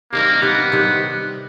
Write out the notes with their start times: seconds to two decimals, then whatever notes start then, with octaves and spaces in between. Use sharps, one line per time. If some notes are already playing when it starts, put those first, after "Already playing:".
0.12 C3 D#3 G3 A#3
0.42 C3 D#3 G3 B3
0.72 C3 D#3 G3